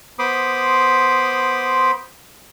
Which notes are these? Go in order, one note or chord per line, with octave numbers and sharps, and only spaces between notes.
B3 C5 B5 C6 D6 D#6